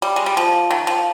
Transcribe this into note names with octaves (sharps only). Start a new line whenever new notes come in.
G3
G#3
G3
F3
D#3
F3